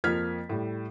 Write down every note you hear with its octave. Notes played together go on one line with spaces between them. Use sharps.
F2 F3 A#3 F6 G#6 B6
A2 G3